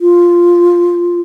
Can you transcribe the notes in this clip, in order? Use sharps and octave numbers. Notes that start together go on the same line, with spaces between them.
F4